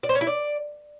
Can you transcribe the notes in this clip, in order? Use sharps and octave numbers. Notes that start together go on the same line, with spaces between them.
D5
C5
C#4
E4
D5